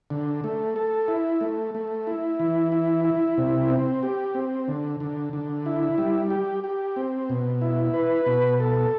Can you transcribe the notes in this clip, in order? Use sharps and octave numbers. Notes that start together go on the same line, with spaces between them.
D3
A3
A4
E4
A3
A3
E4
E3
E4
E4
C3
C4
G4
C4
D3
D3
D3
E4
G3
G4
G4
C4
B2
E4
B4
B2
A4